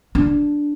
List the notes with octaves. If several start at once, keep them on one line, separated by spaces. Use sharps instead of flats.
D4